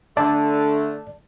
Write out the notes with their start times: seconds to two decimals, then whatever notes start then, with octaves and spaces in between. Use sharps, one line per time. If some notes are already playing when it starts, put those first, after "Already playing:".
0.17 D3 A3 D5 A5